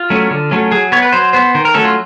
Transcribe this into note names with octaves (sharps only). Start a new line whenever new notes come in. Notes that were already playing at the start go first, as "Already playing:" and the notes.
Already playing: F4
F#3 A3 C#4
D3
F#3 A3 C#4
F#3 G#4
B3 C#5
B4
F#3 C5
B3 C5
D#3 C5
A#4
F#3 A3 C#4 A4
F4